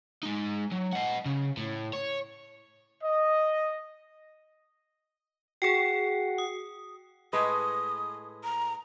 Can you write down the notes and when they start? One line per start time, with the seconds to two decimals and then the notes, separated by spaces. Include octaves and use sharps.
0.23 G#3 D#4
0.72 F#3
0.93 D#5 F#5
1.26 C#3
1.57 A2
1.93 C#5
3.03 D#5
5.62 F#4 G#4 G5 C7 C#7
6.38 D#6
7.33 A2 G#3 B4 D#6
8.44 A#5